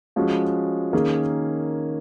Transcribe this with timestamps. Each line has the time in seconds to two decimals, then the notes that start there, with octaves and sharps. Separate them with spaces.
0.16 F3 G#3 C#4 F#4
0.93 D#3 A#3 C#4 G#4